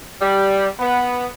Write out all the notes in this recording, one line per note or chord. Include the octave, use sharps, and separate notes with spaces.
G3
B3